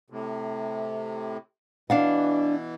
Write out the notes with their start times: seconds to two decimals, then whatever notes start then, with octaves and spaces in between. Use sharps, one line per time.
0.10 A2 C3
1.90 B2 E3 D4 F5 F#5